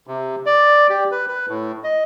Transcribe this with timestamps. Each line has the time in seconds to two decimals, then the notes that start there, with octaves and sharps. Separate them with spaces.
0.07 C3
0.46 D5
0.90 G4
1.12 B4
1.28 B4
1.48 A2
1.84 D#5